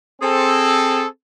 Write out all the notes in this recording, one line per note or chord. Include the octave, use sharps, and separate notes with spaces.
C4 G#4 A4